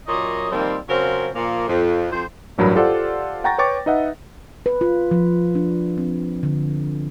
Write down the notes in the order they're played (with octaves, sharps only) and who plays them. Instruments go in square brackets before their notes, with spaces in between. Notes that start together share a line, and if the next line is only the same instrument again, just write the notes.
[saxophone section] F#2 A#2 A#3 C#5 D#5
D#3 F3 G3 A#3 C4
C#3 F#3 C4 C#4 F4 A#4
A#2 F3 A#3
F2
F2 C5
[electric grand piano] A1 G2 F#3 A#4 B5
F4 G4 A4 C5 D5 F#5
F#5 G5 A#5 C#6 A6 A#6
B4 C#5 G5 C#6 D6 A6
D#4 B4 D#5 E5 F#5
[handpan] B4
F4
F3
D4
C4
D3